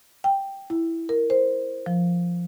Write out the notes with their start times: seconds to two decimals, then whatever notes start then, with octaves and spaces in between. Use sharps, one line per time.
0.24 G5
0.70 E4
1.09 A#4
1.30 C5
1.86 F3